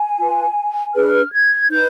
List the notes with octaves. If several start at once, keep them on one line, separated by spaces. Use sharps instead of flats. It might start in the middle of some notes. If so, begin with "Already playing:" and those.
Already playing: G#5
F4 B4
D4 G#4 B4 F6
G#6
D#4 B4 G6